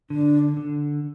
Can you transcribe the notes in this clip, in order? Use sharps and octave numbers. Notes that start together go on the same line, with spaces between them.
D3 D4
D3